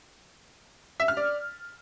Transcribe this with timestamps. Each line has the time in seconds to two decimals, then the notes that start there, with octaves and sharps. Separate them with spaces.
1.00 E5
1.08 F6
1.17 D5